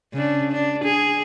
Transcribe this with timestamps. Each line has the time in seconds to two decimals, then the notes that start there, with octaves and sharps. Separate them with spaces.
0.13 C#3 D4
0.52 D4
0.84 G#4